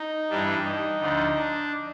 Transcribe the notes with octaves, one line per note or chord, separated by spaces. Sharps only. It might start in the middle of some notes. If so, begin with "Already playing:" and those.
Already playing: D#4
G2 E3 G3 D4
D#4
D2 D3 F3
D4